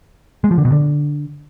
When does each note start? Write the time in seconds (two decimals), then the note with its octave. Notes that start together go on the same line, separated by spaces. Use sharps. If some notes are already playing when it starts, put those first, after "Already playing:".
0.44 G#3
0.51 F3
0.58 D3
0.65 B2
0.72 D3